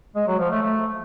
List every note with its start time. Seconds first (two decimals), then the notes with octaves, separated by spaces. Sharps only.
0.16 G#3
0.27 F#3
0.39 F3
0.51 A3
0.63 A3